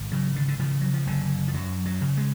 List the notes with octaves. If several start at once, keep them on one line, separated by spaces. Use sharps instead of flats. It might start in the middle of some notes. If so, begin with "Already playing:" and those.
Already playing: G#1
C#3 F#3
D3
D3
C#3 F3
F#3
F3
F#1 D3
F3
F#2 F#3
F#3
C#3
G#3